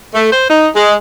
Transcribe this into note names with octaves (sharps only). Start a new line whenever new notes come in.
A3
C5
D#4
G#3